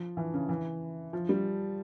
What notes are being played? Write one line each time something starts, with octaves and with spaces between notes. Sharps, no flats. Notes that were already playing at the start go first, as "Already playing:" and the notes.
Already playing: F3
E3
C#3
E3
F3
G3